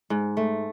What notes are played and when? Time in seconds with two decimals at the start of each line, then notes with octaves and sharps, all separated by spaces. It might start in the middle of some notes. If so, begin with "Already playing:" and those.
0.10 G#2
0.37 A3